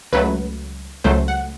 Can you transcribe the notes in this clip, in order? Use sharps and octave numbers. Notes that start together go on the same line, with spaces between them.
C#2 C#3 F#3 A3 B4
C#2 C#3 F#3 A3 C5
F#5